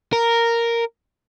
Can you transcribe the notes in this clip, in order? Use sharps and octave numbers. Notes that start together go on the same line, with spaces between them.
A#4